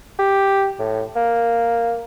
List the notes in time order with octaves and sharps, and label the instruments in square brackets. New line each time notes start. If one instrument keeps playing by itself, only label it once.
[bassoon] G4
A2
A#3